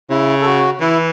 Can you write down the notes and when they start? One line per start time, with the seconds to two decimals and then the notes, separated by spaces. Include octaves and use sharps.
0.10 C#3 E4
0.41 A4
0.46 F#4
0.80 E3 E4